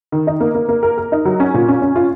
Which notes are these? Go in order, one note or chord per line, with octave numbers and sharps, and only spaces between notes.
D#3
D#4
A#3
A#3
A#3
A#4
A#4
D#4
F#3
C#4
A#2
C#4
C#4
F4